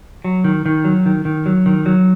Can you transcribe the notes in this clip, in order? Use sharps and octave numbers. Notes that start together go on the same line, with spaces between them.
F#3
D#3
D#3
F#3
D#3
D#3
F#3
D#3
F#3